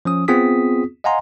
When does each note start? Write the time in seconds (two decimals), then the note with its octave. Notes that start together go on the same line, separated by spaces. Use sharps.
0.05 F3 C#4 D#6
0.28 B3 C4 F4 G#4 D#6 B6
1.04 D#5 F5 F#5 G#5 A#5 C6